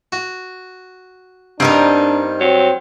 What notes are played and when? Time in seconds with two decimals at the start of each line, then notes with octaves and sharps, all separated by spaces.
0.12 F#4
1.60 G2 B3 C4 D4 D#4 A#4
2.40 F#3 C4